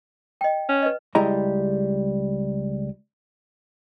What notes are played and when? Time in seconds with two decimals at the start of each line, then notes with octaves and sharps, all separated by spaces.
0.41 D#5 G5
0.69 C#4
0.82 B4 D#5
1.15 C#2 G3 G#3 E4 D#5 A#5